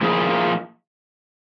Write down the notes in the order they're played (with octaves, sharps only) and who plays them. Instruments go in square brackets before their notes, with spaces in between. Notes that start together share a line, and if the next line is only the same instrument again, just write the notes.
[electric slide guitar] A#2 F3 A#3 E4 G#4